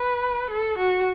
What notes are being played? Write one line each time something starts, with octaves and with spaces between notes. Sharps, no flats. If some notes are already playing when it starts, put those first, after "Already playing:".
Already playing: B4
A4
F#4